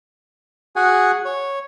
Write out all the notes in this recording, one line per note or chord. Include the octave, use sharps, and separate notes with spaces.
F#4 G#4 F#5 G#5
C#5